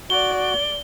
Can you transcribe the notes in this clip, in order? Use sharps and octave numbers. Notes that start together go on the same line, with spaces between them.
F#4 D5 G7